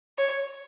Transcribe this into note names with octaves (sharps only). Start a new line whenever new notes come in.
C#5